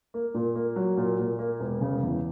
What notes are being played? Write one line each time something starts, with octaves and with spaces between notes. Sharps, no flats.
A#3
A#2
A#3
F#3
A#2
A#2
A#3
E1
C#3
E2